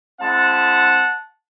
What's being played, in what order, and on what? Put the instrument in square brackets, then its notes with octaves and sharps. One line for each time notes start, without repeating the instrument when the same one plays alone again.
[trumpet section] G#3 C4 E4 F#5 A5